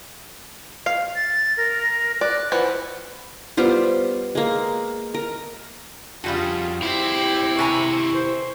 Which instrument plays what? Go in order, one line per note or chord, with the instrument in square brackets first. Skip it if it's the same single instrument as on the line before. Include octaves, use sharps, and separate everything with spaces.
[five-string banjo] F5
[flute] A6
A#4
[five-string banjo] D5 [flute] F#6
[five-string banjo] E3 F3 [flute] F#5
[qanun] G3 B3 F4 C5
G#3 A#3
A#4
[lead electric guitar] F2 [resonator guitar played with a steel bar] C#3 G3 F#4 [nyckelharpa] F4
[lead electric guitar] D#2 C4 [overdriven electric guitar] E4 [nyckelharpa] G4
[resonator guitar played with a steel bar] C3 G#5 A#5 [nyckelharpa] C#6
[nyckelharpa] C5